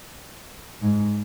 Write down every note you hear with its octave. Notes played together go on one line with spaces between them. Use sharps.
G#2